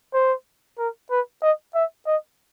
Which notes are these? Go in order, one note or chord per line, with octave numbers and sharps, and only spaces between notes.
C5
A#4
B4
D#5
E5
D#5